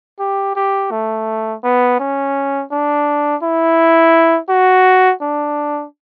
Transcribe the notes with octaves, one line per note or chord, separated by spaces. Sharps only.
G4
G4
A3
B3
C#4
D4
E4
F#4
D4